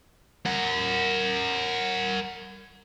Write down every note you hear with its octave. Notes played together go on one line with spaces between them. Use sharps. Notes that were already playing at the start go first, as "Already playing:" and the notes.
A#4 F#5